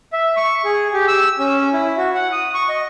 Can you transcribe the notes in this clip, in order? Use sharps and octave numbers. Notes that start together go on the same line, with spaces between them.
E5
C#6
G#4
G4
E6
C#4
E4
F#4
F#5
D#6
C#6
D#5